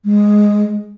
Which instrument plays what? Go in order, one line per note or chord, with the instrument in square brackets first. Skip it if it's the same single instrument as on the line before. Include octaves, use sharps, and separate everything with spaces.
[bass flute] G#3